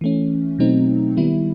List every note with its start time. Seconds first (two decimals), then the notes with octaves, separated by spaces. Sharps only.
0.01 E3 A3 C#4
0.59 B2 F#3 A3 C4 D#4
1.17 D#3 G3 B3 E4